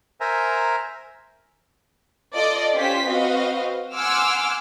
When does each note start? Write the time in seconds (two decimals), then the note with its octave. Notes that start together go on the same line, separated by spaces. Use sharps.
0.20 A#4 C5 E5 G#5 A#5
2.34 F4 A4 D5 D#5
2.74 C#4 F4 G4 C5 C6 B6
3.08 C4 F#4 B4 D#5 F5
3.94 F#5 G#5 C6 D6 E6 F6